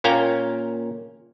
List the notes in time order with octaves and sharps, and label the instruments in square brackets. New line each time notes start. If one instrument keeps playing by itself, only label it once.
[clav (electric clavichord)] A#2 A#3 C#4 F5 G5 A#5